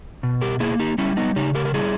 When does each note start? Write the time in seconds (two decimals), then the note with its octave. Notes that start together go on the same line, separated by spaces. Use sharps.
0.23 B2
0.41 G4 A#4
0.60 A#3 E4 G#4
0.79 D#4 G4
0.98 G3 C#4 E4
1.17 B3 D#4
1.36 C#3 D#4 G4
1.55 G4 A#4
1.65 A#4
1.74 G3 E4 G#4